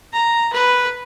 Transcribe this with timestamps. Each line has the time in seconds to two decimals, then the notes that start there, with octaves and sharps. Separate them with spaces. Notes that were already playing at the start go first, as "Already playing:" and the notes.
0.12 A#5
0.53 B4